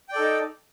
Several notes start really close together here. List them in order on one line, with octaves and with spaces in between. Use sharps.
G5 D5 A4 D#4